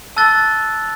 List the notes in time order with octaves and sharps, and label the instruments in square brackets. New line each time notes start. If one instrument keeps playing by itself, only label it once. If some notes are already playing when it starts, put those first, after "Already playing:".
[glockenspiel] A5 E6 F#6 A6 G7